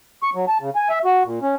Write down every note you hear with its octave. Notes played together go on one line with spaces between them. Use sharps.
C#6
F#3
A5
C#3
G#5
E5
F#4
A#2
C#4